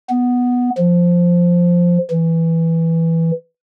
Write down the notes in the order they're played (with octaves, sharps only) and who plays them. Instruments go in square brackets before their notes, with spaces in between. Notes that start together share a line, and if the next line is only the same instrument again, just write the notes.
[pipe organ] B3
F3
E3